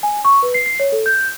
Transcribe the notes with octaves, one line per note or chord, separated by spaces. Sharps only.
G#5
C#6
B4
C7
C7
C#5
A4
G6